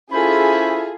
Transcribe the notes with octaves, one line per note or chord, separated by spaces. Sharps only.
C#4 E4 F4 G#4 A4 C5 B5